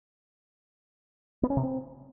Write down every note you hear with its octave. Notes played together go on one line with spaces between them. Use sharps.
B3
C#4
C3
C4